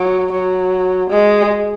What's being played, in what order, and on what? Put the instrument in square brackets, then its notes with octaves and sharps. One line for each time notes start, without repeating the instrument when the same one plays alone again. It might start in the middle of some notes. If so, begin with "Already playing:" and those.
Already playing: [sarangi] F#3
F#3
G#3